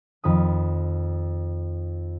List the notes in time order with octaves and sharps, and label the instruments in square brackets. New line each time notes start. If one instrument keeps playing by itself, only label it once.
[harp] F2 D#3 B5 D#6